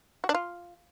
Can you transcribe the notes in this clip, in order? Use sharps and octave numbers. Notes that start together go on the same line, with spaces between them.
F#4
D4
F4